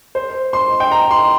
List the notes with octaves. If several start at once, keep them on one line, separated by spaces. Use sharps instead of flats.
C5
C6
G5
A#5
C6